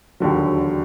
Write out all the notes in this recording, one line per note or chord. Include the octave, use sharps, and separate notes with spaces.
E1 D#2 D3 F#3